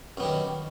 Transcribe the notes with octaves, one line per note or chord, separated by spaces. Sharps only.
F#2 D#3 G3 B3